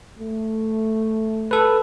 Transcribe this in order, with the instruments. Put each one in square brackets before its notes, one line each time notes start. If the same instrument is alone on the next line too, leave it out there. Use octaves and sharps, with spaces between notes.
[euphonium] A3
[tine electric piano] A4 B4